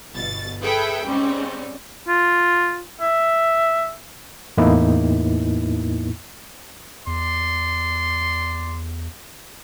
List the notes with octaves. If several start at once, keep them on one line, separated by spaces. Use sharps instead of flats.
G1 B2 A6
G#4 A4 B4 E5 G5 B5
G#2 G3 C4 C#4
F4
E5
E2 A2 A#3 B3 D#4 E4
E2 D5 C6